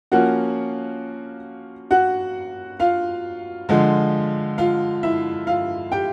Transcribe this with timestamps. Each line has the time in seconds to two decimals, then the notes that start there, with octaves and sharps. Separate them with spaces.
0.12 F3 A#3 C#4 F4 F#4 F#5
1.91 F#4 F#5
2.80 F4 F5
3.69 D3 F3 G#3
4.58 F4 F5
5.03 E4 E5
5.47 F4 F5
5.92 G4 G5